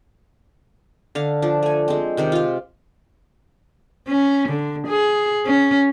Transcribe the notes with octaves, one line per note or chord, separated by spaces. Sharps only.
D3 F5
F3 D4
A3 G#5
G#3 C4
C3 D#3 C4
F4 F5
C#4
D3
G#4
C#4